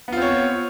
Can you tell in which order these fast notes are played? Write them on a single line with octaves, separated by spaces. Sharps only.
B3 F4 C4 C#5